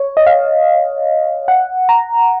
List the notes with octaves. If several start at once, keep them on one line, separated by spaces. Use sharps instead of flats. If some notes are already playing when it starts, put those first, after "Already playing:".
Already playing: C#5
D#5
F5
F#5
A#5